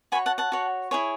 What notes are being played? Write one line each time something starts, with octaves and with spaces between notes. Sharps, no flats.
F#4 C#5 G#5 B5
F#5 A5
F#5 A5
F#4 C#5
E4 G#4 C#5